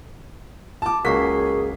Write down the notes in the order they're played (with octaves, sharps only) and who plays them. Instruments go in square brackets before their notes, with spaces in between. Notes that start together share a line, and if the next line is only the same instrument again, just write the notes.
[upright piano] A5 D6
[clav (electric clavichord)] C#2 A#3 F#4 [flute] G#4 [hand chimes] A#4 C#6 C7 [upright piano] B6